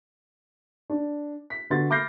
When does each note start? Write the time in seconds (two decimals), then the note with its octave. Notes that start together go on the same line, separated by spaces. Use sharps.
0.90 D4
1.50 B6
1.70 D3 B3 F#4 C6 A6
1.90 B5 D6 F6 G6 A#6 C7